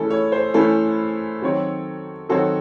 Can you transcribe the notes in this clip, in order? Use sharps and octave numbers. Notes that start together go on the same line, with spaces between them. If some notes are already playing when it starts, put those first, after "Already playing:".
Already playing: E3 A3 C#4 E4 G#4 A4
C#5
C5
E3 A3 C#4 E4 A4
D#3 F#3 C4 F#4 C#5
D#3 F#3 C4 F#4 A4 C#5